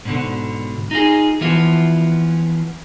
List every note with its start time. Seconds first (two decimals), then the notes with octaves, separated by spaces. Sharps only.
0.05 G#2 B2 D3
0.91 D#4 F4 G#4
1.41 E3 F3 B3 F4